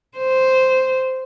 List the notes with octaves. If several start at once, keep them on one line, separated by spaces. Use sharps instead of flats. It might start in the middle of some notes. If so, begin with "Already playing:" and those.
C5